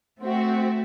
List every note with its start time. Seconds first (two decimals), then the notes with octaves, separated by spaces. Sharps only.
0.21 A3 C4 F#4 E5